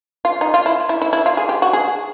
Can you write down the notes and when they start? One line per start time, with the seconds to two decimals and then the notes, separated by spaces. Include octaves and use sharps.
0.25 F4
0.41 D#4
0.54 F4
0.66 E4
0.89 E4
1.02 E4
1.13 E4
1.26 F4
1.37 G#4
1.49 G4
1.62 F#4
1.73 G#4